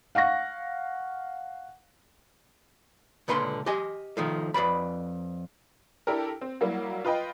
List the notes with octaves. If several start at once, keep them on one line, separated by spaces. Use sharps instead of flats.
F5 F#5 C#6 A#6
C#2 A#2 D3 B4 A#5 C6
G4 D#5 G#5
D#3 F3 A3
F2 B4 D5 B5
D4 E4 G4 A4 A#4
C4
F#3 G3 A#3 E4
F4 B4 D#5 G5 B5